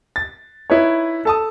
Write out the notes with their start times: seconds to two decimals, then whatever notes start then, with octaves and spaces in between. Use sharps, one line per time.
0.16 A6
0.70 D#4 E4 B4 C#5
1.25 A4 A5 D#6